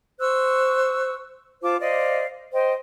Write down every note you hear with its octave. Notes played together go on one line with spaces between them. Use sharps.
C5 C#6 E6 F#6
F4 C5 A5 D6
C5 D5 D#5 F5
C5 D#5 G5